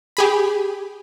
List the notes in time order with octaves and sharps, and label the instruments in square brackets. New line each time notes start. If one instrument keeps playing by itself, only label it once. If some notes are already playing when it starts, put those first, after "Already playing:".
[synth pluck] G4 G#4 B5